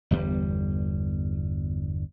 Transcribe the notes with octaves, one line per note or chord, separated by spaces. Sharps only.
G1 E2 G3